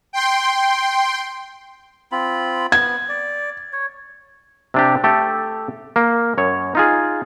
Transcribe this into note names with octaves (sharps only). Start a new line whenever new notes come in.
G5 C6
C4 F4 B5
B3 G#6
D5
C#5
C3 D4 G4
A3 G4 A4
A#3
F#2 C#5
D#4 F4 G#4